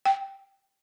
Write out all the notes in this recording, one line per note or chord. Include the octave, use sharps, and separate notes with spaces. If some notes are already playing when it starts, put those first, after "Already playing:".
G5